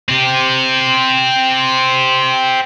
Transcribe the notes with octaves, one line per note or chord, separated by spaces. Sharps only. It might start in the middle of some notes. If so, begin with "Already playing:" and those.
C4 G4